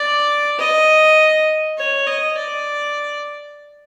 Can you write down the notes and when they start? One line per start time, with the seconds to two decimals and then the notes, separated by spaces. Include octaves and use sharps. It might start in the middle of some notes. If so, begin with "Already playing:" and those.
Already playing: D5
0.59 D#5
1.78 C#5
2.07 D#5
2.37 D5